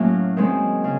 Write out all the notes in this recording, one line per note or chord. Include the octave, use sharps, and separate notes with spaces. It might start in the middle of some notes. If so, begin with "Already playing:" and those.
Already playing: A2 F#3 A#3 C#4
D#3 G#3 C4
C#3